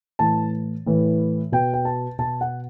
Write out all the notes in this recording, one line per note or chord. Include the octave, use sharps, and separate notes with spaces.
A2 E3 A5
A2 E3
B2 G5
G5
A5
B2 A5
F#5